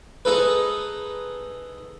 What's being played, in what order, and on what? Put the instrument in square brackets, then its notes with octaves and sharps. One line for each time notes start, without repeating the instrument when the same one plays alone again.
[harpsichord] G#3 D#4 A4 B4